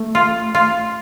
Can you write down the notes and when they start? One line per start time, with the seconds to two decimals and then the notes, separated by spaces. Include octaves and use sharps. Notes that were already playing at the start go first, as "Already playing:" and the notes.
Already playing: A3
0.15 F4
0.55 F4